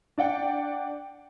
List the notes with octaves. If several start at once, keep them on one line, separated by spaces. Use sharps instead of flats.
D4 D5 F#5 G5